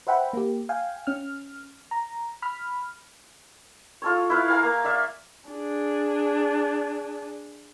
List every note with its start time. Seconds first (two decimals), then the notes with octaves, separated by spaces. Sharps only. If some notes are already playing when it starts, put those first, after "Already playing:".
0.07 B4 C5 E5 F#5 G5 B5
0.33 A#3 G4
0.69 F5 G5 G#5
1.07 C#4 F6
1.91 A#5
2.42 B5 F6
4.02 F4 A4 C#5
4.30 E4 B4 F5
4.48 F5 G#5 A#5
4.63 A#3
4.85 D5 E5 F5
5.50 D4 G#4